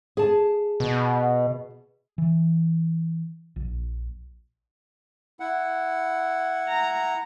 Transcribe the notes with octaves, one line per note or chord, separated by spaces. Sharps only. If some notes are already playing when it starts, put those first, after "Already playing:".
G#4 A5
B2
E3
A#1
E4 F#5
A#5